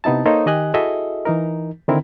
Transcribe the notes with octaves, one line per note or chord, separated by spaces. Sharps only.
C3 B3 D#4 E4 A5
A#3 D#4 A4 C5 C#5
D#3 G4 D#5 G#5 F#6
E4 F#4 G#4 A4 D#5 E5
E3 D#4 A#4
D3 D#3 C4 E4 A#4